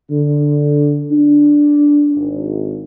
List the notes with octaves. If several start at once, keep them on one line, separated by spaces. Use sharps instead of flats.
D3
D4
G#1